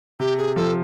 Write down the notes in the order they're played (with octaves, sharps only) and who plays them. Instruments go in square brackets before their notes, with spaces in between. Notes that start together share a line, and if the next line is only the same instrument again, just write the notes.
[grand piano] C3 [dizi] G4
[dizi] G#4
[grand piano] F3 [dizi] A4